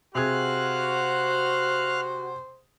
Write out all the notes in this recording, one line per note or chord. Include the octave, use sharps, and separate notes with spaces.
C3 F#4 G#4 C5 F5 F6 F#6